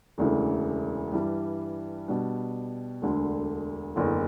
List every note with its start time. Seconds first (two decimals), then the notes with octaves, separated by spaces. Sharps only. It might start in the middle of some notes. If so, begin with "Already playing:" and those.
0.18 E1 D2 C#3 E3 A3
1.12 G2 E3 G3
2.08 B2 G3 D4
3.02 E1 D2 D3
3.96 F#1 E2 D3